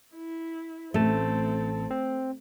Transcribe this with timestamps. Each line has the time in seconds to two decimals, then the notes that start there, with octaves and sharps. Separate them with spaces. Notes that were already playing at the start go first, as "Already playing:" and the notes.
0.14 E4
0.94 A1 A3 C4 A4 A5
1.91 C4